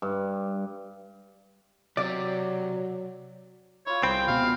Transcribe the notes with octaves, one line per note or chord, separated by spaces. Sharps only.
G2
C3 F#3 D5
E4 F4 C#5
C2 C4 G#4 B4 G5
C#2 B2 B3 F5